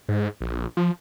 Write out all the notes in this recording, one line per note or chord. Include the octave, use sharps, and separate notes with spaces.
G#2
A#1
F3